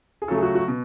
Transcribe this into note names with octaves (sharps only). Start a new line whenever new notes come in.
G#4
C#3 F#3 A3 A4
G#4
F#4
F#4
B2